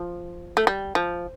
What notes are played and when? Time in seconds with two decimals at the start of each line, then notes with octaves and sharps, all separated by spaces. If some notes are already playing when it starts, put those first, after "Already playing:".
Already playing: F3
0.57 A3
0.67 G3
0.95 F3